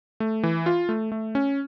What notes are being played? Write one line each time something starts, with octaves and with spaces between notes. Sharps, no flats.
A3
E3
F4
A3
A3
C#4